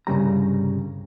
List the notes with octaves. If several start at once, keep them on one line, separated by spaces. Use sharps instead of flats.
C2 G2 C#3 G3 A#5